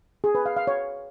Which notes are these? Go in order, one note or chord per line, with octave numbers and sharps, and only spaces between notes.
G#4
B4
F5
F5
C#5